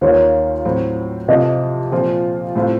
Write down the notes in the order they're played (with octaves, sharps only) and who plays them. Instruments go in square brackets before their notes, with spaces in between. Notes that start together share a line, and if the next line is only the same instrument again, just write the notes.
[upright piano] D#2 D#3 A#3 F4 [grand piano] C#5
[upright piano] A2 F#3 C4
[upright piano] F2 C3 F3 [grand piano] D#5
[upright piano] A#2 F3 C4 F4
A2 A3 C4 F4